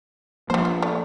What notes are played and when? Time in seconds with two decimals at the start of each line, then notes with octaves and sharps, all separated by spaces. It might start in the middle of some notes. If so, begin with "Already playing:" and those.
0.50 F3 G3 A#3 C5
0.65 B3
0.82 A3 D5